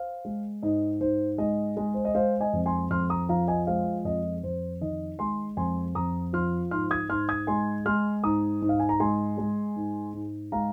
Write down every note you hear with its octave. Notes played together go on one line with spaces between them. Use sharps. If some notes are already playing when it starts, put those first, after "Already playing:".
Already playing: C5 F5
G#3
G#2 D#5
G#2 C5
G#3 D#5
G#3
C5
D#5
G#3 C5 F5
D#5 G#5
F2
G#5 C6
F2 C6 F6
A#5 D#6
F3 F5 A#5
D#5 G#5
G#3 C5 F5
F2 D#5
F2 C5
D#3 D#5
G#3 G#5 C6
F2 G#5 C6
F2 A#5 D#6
F3 C6 F6
G#2 C6 F6
D#6 G#6
G#2 C6 F6
D#6 G#6
G#3 G#5 C6
G#3 C6 F6
G#2 A#5 D#6
G#2
F5
G#5
A#5
G#3 G#5 C6
G#3
G#2
G#2
G#3 F5 A#5